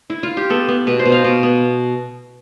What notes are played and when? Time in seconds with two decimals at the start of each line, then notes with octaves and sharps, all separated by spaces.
0.10 E4
0.23 F4
0.37 G4
0.50 B3 A4
0.68 B3
0.87 B2 B4
0.99 C5
1.05 B2
1.12 F5
1.24 B2
1.43 B3